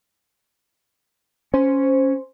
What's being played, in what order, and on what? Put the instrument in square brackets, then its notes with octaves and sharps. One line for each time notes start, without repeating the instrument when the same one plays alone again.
[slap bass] C#4 [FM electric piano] C5